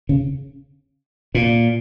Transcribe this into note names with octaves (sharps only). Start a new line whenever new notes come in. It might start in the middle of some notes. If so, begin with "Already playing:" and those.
C#3
A#2